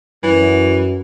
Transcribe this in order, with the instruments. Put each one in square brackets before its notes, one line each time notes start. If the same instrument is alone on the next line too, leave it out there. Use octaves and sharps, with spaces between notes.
[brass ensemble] F#2 [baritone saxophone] E3